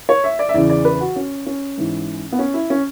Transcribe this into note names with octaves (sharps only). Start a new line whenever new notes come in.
C#5
E5
D5
E5
E2 C#3 E3 D5
D5
B4
F#4
C#4
C#4
G#2 E3
B3
C#4
E4
C#4